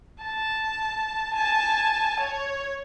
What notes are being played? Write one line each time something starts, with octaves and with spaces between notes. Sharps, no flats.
A5
G#5 A5
C#5